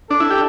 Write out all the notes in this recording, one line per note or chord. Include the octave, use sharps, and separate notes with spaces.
D4 A4
E4
G4